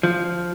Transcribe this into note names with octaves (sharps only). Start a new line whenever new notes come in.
F3